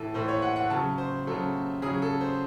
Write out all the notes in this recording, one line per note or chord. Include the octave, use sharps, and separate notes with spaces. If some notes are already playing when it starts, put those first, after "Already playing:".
Already playing: A2 E3 A4
A2 E3 C5
C#5
F#5
F#5
C#3 F#3 A5
C5
C#3 F#3 A4
C#3 F#3 G#4
A4
C5